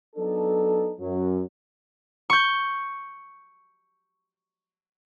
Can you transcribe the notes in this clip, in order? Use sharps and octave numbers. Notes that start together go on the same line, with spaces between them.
F#3 B3 D4 D#4 A4
F#2 F#3
C#6 G6